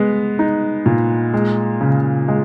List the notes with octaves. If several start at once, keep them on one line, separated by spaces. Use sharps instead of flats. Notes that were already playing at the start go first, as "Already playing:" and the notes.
Already playing: G#3 B3
D#4
A#2
G#3
C#3
G#3